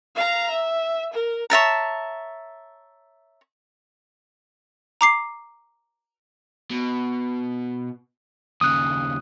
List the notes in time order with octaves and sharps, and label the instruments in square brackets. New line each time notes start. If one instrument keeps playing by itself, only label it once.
[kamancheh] F5 A#5
E5
A#4
[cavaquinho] C#5 E5 A5 A#5
[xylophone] A#5 D6 C7
[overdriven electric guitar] B2
[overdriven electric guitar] D#2 C#3 [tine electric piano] D#6 F#6